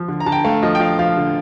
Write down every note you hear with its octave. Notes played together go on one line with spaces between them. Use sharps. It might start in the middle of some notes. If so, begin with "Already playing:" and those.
Already playing: F3
D3
A#5
D3 A5
G5
A3 F5
F3 D#5
G5
F3 F5
F3 F5
D3